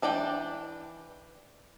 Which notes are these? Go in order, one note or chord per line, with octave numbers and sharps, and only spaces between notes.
E3 D4 D5 G5